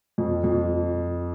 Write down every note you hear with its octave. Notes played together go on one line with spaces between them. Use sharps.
F2
F2